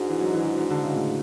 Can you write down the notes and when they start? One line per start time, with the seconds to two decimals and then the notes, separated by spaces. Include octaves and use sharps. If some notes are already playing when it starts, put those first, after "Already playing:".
Already playing: G#2 G#3 D4 F#4
0.09 E3
0.21 F#3
0.33 E3
0.45 E3
0.57 E3
0.70 D3
0.83 C#3
0.95 A2